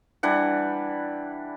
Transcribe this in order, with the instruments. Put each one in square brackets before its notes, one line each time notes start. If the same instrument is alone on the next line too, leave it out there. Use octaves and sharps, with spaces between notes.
[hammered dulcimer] E3 G3 D4 F#5